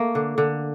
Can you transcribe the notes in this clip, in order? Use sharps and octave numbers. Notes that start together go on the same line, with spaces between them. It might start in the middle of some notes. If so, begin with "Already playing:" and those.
Already playing: A3 A#3
D3
D3